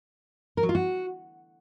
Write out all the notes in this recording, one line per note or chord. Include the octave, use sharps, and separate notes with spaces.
A#4
F#3
F4
F#4